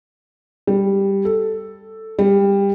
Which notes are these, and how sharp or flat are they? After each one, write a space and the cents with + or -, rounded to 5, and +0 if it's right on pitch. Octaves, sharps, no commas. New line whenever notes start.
G3 +5
A4 +5
G3 +20